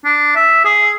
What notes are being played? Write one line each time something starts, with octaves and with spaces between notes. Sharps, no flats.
D4
E5
G#4